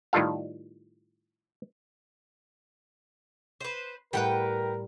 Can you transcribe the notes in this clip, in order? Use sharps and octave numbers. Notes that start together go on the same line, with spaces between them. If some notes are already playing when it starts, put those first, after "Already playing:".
A2 D#3 G3 F4 A4 F5
B4 C5
A2 G3 A#4 B4 F#5 G5